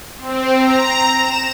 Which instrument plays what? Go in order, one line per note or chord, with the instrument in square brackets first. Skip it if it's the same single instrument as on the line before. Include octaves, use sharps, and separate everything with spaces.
[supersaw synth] C4
A#5
E7